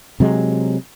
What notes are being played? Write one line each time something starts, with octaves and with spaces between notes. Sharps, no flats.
C3 F#3 G#3